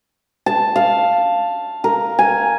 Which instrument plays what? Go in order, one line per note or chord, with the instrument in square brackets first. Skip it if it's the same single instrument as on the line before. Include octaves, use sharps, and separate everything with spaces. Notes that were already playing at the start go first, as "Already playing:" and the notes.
[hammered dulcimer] A5
F5
A#4
G#5